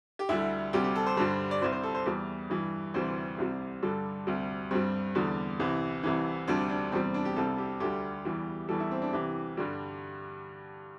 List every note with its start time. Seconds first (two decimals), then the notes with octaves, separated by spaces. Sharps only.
0.19 G4
0.29 D2 D3 G3 E4
0.73 D2 C3 G3 G4
0.84 G4
0.96 A4
1.06 C5
1.17 G2 D3 G3 C5
1.51 D5
1.62 C2 C3 G3 C5
1.72 C5
1.83 A4
1.95 C5
2.06 E2 E3 G3
2.50 G2 E3 G3
2.94 D2 C3 E3 G3 C5
3.38 C2 C3 G3
3.83 G2 D3 G3 A4
4.27 D2 C3 G3
4.71 G2 G3 C4
5.15 E2 D3 G3
5.59 C2 C3 E3
6.03 C2 C3 E3
6.48 D2 C3 G3 D4
6.70 D4
6.92 E2 C3 G3 C4
7.03 C4
7.14 D4
7.25 G4
7.36 C2 C3 G3 A4
7.58 G4
7.80 D2 D3 G3 G4
8.25 E2 E3 G3
8.69 E2 E3 G3 A4
8.80 E4
8.91 C4
9.02 D4
9.13 C2 C3 E3 G4
9.57 G2 D3 G3